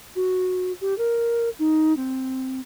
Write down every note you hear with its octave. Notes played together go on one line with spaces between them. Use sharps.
F#4
G4
A#4
D#4
C4